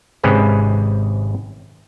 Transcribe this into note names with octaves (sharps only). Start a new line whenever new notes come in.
G#1 G#2 C3 C#4 G#4 B4